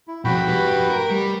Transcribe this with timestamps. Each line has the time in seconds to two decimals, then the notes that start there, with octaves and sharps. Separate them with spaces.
0.08 E4
0.25 B2 F3 F#4 G5 B5
0.48 G4 B4
0.90 A#4
1.10 G3